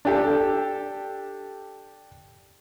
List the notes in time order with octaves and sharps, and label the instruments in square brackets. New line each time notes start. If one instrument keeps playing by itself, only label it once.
[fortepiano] D4 G4 A4